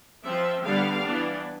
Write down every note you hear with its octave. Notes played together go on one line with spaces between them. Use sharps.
F3 C4 E5
D3 G3 B3 D4 F5
E3 B3 D4